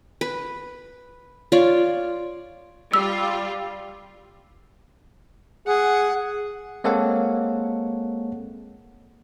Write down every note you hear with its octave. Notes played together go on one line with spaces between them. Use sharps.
B4
F4 C#5 D5
G3 F4 E6
G#4 F#5
G#3 A#3 C4 A4 C#5 F#5